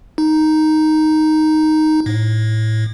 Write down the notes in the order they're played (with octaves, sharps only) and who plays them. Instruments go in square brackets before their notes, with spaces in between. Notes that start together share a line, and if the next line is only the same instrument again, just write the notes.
[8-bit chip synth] D#4
A2